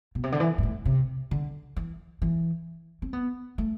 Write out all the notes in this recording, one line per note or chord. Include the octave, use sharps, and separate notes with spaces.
B2
C3
D3
E3
G#2
A2
C3
D3
E3
E3
C4
B3
A3